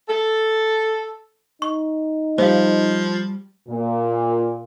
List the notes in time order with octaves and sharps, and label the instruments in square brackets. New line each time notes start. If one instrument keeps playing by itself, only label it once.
[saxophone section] A4
[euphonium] D#4 [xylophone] C#6
[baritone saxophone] F3 [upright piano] G3 [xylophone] C5 F5
[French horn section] A#2